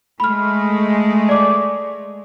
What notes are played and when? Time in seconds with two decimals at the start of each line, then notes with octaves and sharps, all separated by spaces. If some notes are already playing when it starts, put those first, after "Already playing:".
0.20 G#3 A3 B5 F6
1.29 D5 D6